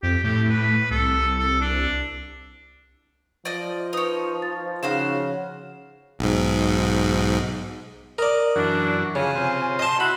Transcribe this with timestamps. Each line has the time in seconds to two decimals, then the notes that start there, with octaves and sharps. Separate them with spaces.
0.03 F2 G4
0.24 A2 G4
0.50 B4
0.91 C2 A4
1.38 A4
1.61 D4
3.45 F3 D5 D#5
3.93 D#4 B4 C#5 D#6
4.42 A6
4.83 C#3 D#4 F#4 C5 F5 E7
6.19 B1 G#2
8.18 A#4 D5 D#5
8.56 F#2 E3 D4 F#4
9.15 C#3 F3 C#4 G#5
9.35 C3 F4 C5
9.79 D#5 A5 C6
10.00 E4 F#4 B5